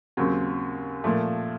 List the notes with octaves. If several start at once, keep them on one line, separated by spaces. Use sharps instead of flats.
D#2 C#3 F#3 C4
A#2 F3 A3